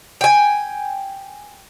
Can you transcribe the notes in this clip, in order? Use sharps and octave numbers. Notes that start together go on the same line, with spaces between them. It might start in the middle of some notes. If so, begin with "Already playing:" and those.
G5 G#5